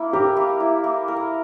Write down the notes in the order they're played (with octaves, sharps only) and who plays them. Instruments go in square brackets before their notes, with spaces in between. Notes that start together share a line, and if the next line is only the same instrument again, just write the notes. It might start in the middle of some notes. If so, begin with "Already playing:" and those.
Already playing: [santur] A#3 E4
[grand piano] G4 [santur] A#4
[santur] A#3
E4
A#3
A#4